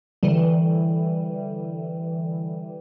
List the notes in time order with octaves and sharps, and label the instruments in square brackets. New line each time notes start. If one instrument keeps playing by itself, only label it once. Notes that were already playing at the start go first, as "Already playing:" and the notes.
[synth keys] D3 E3 G3